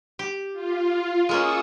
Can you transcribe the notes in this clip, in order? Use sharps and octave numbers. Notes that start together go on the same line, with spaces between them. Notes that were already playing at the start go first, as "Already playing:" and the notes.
G4
F4
G#3 A#3 C#4 C#6 D#6 E6